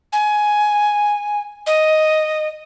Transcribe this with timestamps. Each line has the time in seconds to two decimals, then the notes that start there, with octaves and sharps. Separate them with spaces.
0.13 G#5
1.66 D#5